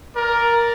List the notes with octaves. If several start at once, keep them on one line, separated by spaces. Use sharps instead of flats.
A#4 D5